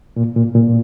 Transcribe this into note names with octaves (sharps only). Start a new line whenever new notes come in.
A#2
A#2
A#2